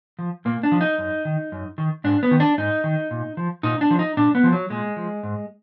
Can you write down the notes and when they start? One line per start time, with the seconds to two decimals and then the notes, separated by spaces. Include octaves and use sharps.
0.19 F3
0.45 A#2 A#3
0.63 D4
0.72 F3
0.81 D#4
0.98 F#2
1.25 D#3
1.52 F#2
1.78 D#3
2.04 G#2 D4
2.23 B3
2.31 D#3
2.40 D4
2.58 G#2 D#4
2.84 D#3
3.11 A#2
3.37 F3
3.63 A#2 D#4
3.81 D4
3.91 F3
3.99 D#4
4.17 A#2 D4
4.35 B3
4.44 F3
4.52 F#3
4.70 A#2 G#3
4.97 F3
5.23 G#2